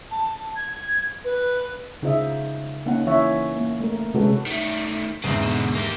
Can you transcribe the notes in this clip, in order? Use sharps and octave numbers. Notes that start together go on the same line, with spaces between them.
A5
G#6
B4
C#3 D#4 F4 C5 D#5 E5
A#3 C#4 D#4 F#5
E3 C#4 C#5 E5
A#3
A3 A#4
C3 G#3 C#4 F#4 A4 B4
D#3 A3
E2 G#2 C#3 C4
B2 D3
A#3 G4